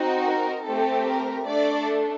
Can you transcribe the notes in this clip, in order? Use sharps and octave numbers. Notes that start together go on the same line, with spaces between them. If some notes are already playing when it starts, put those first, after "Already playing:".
Already playing: C4 D#4 F#4
A#4
A3 C4 G4 A4
A#4
A3 D4 A4 D5